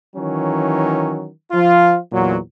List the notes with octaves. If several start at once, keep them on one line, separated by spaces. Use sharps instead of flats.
D#3 E3 F#3 C#4
F3 F4
E2 A#2 F#3